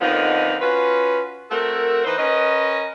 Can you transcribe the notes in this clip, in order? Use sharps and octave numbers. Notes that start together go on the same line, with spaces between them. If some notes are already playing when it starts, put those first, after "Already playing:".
F2 D3 D#3 F3 B3 D#4
C#4 F4 F#4 B4
A3 C4 F#4 A4 A#4
E3 D#4 B4 C5
C#4 A#4 B4 D#5